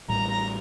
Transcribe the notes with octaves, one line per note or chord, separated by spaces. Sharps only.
A1 A2 E3 G3 A#5
A#5